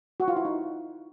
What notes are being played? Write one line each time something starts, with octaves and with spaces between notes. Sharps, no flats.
F#4
F4
E4
D#4